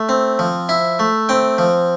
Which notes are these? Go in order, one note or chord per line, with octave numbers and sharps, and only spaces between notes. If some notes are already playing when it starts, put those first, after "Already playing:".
Already playing: A3
C4
F3
E4
A3
C4 G5
F3